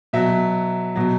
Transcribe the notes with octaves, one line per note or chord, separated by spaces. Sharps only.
B2 F#3 E5
B2 F#3